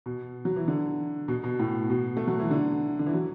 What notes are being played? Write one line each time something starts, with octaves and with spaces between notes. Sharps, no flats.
B2
F#3
E3
D3
B2
B2
A2
B2
A3
F#3
E3
D3
D3
E3
F#3